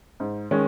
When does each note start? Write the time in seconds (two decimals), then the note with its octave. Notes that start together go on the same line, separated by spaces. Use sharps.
0.20 G#2
0.51 D#3 G#3 C#4